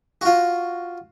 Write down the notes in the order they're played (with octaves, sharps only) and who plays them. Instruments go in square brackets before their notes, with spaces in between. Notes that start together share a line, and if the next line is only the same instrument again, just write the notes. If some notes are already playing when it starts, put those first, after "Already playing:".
[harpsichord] F4 F#4